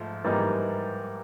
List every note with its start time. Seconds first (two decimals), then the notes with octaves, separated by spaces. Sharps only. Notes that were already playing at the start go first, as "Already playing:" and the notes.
Already playing: G#2 F3 A3
0.24 G#2 E3 G3 A#3 D#4